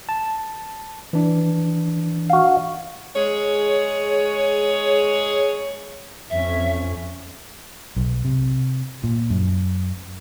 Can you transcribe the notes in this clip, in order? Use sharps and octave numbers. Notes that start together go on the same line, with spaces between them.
A5
E3 D4
F#4 F5
G#3 G#4 C#5
F2 C#4 E5
B1
C3
A#2
F#2